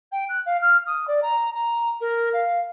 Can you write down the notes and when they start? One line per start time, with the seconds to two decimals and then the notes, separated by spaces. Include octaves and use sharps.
0.12 G5
0.29 F#6
0.46 F5
0.62 F6
0.86 D#6
1.07 D5
1.22 A#5
1.55 A#5
2.00 A#4
2.33 F5